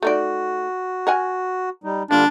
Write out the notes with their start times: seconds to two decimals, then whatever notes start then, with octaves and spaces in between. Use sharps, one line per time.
0.02 A3 D#4 F#4 D5
1.07 A#4 F#5 G#5
1.84 G3 D#4
2.11 D3 G3 A#3 D4 F4